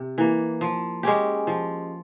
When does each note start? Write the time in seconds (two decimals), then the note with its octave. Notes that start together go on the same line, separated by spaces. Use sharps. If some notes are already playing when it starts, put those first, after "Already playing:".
Already playing: C3
0.18 E3 A#3
0.61 F3
1.03 G#3 C#4 G4
1.47 F3